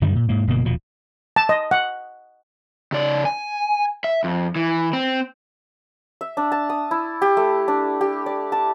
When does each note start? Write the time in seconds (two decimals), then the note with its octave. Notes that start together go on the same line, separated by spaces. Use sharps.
0.02 F#2 D3 D#3 G3
0.15 A#2
0.29 G#2 A#3
0.47 G1 B2 A#3
0.65 D#1 B2 F3
1.36 A5
1.49 D#5
1.71 F#5
2.92 C#3 D5
3.25 G#5
4.04 E5
4.24 F2
4.56 E3
4.93 C4
6.21 E5
6.37 D4
6.52 A5
6.70 D#6
6.91 E4
7.22 G4
7.37 A3
7.68 D4
8.01 G4
8.26 D5
8.52 A5